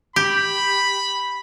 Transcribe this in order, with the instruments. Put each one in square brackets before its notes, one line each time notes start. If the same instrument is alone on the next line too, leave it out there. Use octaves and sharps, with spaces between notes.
[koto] G4 [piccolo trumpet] B5